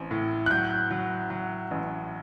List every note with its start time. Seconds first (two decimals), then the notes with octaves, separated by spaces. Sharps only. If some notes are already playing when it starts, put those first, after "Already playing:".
Already playing: A1 C4
0.11 A2
0.46 F#6
0.50 F#3 G6
0.91 F#3
1.30 F#3
1.71 A1